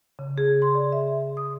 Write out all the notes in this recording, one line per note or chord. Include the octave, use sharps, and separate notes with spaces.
C#3
G#4
C6
D5
E5
D#6